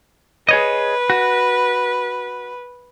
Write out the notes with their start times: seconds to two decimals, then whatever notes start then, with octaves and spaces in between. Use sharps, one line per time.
0.49 G#4 B4 C#5 D#5
1.10 F#4